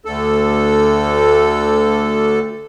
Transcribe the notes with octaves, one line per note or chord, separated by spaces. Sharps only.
D2 A4